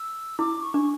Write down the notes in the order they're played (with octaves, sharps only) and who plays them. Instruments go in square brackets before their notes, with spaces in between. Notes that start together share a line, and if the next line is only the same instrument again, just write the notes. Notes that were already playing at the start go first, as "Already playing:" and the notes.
Already playing: [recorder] E6
[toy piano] E4 [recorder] D6
[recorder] C#6
[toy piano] D4